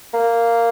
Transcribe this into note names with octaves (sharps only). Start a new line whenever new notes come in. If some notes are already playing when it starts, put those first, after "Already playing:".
A#3